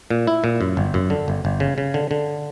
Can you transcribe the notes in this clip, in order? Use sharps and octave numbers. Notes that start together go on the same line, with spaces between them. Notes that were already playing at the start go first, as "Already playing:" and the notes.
A#2
E4
A#2
F#2
G1
F#2
D3
G1
G1
C#3
C#3
D3
D3